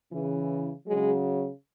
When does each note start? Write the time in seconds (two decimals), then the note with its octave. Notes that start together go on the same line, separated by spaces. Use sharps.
0.11 C#3 E3
0.86 C#3 F#3 G#3